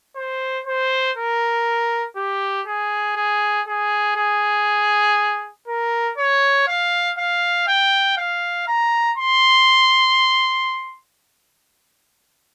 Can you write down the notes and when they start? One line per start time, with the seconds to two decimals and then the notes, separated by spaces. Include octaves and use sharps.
0.16 C5
0.67 C5
1.17 A#4
2.16 G4
2.67 G#4
3.16 G#4
3.67 G#4
4.17 G#4
5.68 A#4
6.18 C#5
6.68 F5
7.18 F5
7.68 G5
8.18 F5
8.68 A#5
9.18 C6